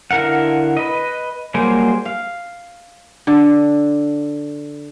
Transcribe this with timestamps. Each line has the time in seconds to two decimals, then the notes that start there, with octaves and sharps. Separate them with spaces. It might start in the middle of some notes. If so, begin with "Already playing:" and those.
0.11 D3 E4 A#4 F5 F#5
0.77 B4 D#5
1.54 F#3 G3 A#3 G#4 C5
2.05 F5
3.27 D3